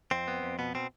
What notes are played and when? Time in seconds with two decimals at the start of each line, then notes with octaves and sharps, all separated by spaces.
0.11 F2 C4
0.28 B3
0.43 F2
0.59 B2 B3
0.75 B2 C4